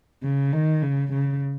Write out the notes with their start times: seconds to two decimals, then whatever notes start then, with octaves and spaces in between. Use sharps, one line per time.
0.23 C#3
0.52 D#3
0.82 C#3
1.12 C#3